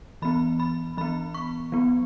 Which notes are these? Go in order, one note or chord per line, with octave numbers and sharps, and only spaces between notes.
E3 B3 B5
B5
E3 B3 B5
C#6
F#3 B3